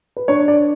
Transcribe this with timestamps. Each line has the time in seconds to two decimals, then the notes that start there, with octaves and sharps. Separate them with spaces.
0.17 B4
0.28 D4 C#5
0.48 D5